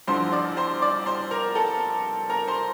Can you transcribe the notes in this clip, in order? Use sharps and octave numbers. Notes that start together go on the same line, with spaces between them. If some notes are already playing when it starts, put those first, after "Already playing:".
A1 G2 D3 F3 C5 C6
D5 D6
C5 C6
D5 D6
C5 C6
A#4 A#5
A4 A5
A#4 A#5
C5 C6